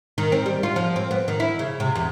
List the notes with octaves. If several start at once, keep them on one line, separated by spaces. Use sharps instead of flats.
D#3
C4
G3
F4
F3
C4
B3
D#3
E4
C#3
C3
E2